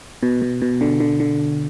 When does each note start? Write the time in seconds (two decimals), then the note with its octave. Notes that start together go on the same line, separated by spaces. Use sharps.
0.23 B2
0.42 B2
0.62 B2
0.81 D3
1.00 D3
1.20 D3